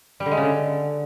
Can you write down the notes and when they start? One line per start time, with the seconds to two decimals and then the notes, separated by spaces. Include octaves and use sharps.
0.20 G3
0.26 D3
0.31 G#3
0.37 C#3
0.43 D3